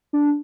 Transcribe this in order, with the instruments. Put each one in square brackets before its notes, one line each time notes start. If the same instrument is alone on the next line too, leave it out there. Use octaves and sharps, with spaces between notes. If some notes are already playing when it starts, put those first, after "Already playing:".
[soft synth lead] D4